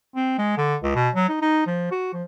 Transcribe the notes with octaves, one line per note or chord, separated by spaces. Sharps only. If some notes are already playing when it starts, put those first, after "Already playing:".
C4
G#3
D3
C#2
B2
F#3
D#4
D#4
F3
F#4
F3